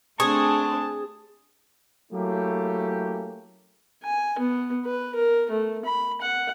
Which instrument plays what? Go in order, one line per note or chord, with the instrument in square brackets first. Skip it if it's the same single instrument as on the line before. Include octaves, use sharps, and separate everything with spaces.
[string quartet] A3 C4 D4 [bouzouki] G#4 [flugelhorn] A5 [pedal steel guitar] C#6
[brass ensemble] F#3 A3 A#3 C#4 E4 G4
[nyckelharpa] G#5
B3
B4
A#4
A3
B5
F#5